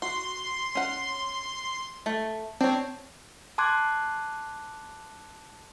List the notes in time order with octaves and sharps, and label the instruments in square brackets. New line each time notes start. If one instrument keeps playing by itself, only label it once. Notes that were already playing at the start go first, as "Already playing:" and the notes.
[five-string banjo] F#4 [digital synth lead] C6
[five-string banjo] C#4 F#5
A3
[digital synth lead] C4 [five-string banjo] D4 C#5
[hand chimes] A5 C6 D6 F#6 G#6